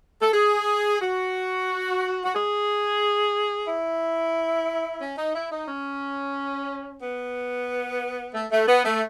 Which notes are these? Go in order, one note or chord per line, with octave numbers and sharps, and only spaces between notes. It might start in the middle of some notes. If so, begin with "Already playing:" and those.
A4
G#4
F#4
F#4
G#4
E4
C#4
D#4
E4
D#4
C#4
B3
A3
A3
B3
A3